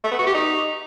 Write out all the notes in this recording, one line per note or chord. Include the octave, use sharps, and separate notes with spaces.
A3
B3
F#4
G4
D#4